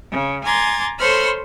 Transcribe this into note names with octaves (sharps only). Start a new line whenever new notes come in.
C#3
G#5 A#5 C6 D6 G#6 A6
A4 C5 C#5 B5 C6 F6